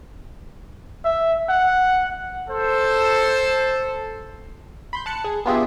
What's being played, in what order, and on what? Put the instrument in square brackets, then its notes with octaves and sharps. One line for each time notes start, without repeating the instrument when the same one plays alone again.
[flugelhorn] E5
F#5
[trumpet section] A4 C5
[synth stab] B5 C6 G6
A5 F#6 C#7
G#4
B3 D4 F4 G4 G#4 E5